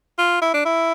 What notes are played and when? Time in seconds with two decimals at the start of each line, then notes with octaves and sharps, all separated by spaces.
0.18 F4
0.42 E4
0.54 D4
0.65 E4